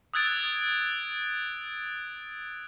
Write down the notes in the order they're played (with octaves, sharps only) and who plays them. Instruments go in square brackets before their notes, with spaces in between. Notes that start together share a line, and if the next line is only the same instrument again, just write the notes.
[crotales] D#6 E6 F#6 G#6 A6 D7